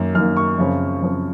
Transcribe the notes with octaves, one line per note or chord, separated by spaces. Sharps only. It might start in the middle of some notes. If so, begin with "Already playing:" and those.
Already playing: F#2 D#3 A#3
F#2 D#3 A#3 F6
C#6
F#2 C#3 F3 C4
F#2 C#3 F3 C4